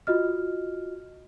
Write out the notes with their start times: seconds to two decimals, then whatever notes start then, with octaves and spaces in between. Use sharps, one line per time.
0.07 F4 F#4 D#5 F6